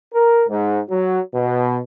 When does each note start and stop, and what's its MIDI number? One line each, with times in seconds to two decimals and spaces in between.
0.14 0.45 70
0.48 0.80 44
0.90 1.20 54
1.35 1.80 47